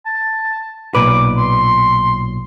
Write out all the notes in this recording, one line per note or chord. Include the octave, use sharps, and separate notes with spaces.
A5
B1 A#2 B4 D6
C6